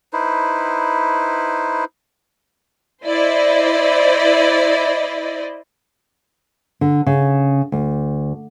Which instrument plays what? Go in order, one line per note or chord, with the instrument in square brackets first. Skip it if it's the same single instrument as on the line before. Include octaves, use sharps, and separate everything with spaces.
[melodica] D#4 E4 B4 C5
[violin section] E4 C5 D5 D#5
[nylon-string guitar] D3
C#3
D2